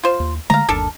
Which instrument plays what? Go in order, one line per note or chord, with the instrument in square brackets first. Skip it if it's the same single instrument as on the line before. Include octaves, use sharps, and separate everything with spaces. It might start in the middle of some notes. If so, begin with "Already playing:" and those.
[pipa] F4 C5
[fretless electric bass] D#2
[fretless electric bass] D3 G#3 A3 [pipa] F5 A#5
[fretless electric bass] G1 D#2 [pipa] D4 A4 A#4